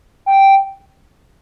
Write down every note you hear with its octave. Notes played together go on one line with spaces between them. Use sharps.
G5